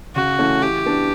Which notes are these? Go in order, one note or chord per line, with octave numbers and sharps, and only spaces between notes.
C#3 F#4
E3 A3 C#4
E3 G4
B3 D4